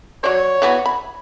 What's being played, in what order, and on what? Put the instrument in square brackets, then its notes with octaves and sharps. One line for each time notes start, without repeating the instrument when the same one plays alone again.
[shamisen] F#3 D5 [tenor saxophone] C#5
[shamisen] E3 B3 F#4
B5